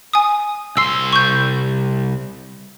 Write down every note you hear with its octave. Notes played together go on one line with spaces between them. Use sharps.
G#5 D#6
C2 C6 E6 C7
C#6 G6